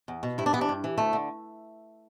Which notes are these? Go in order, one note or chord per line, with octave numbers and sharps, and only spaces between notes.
E2
B2
G2 E4
D4
E3 B3
D4
G2
E3
D2 A3
D3